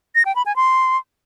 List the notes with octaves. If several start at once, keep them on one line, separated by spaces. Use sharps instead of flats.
A#6
G5
B5
G#5
C6